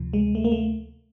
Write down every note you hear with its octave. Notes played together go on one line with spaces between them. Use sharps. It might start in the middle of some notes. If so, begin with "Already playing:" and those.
Already playing: D2 C3 F3
G#3
A3
A#3
A3